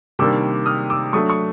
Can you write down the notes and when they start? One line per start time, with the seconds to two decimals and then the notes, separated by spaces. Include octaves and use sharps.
0.19 C3 D#3 G3 A#3 D4 D6 E6
0.66 D#6 F6
0.90 D6 E6
1.13 F#3 A3 D4 C#6 D#6
1.29 C#6 D#6